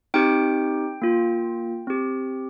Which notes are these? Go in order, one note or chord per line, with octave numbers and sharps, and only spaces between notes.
C4 D#4 G4 G5
A#3 F4
C4 G4